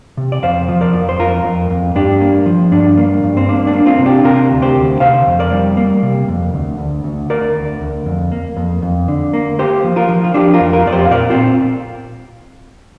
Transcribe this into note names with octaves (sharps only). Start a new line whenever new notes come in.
C3
D5
F2 C5 F5
F3
A#4 D5
F2
C5
F2 F4 A#4
F2
F2
G2 D4 G4
A#3
F3
G2 D4
A#3
G2
C4
A#3 D4
D4
A#3
C4 F4
C3
D4 G4
C3 F4 A#4
D2
G4 C5
D2
C3 C5 F5
F2
A#4 D5
G3
A#3
C3
F2
D2
D2
D2
D2 A#4 D5
D2
D2
F2
A#3
F2
F2
D3
A#3
A#3 G4 C5
F3
F4 A#4
F3
F4
F3 D4 G4
F4 A#4
F2
F4 A#4
F2 D5
G4 C5
F5
A#2 A#4 D5
C4 F4
A#2